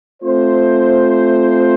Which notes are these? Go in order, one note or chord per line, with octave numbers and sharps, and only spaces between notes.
A3 C4 F4 C5